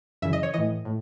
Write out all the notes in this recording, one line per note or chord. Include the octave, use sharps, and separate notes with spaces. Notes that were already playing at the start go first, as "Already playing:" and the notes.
F#2 C#3 E3 E5
D#5
C#5
A2 E3 D#5
A2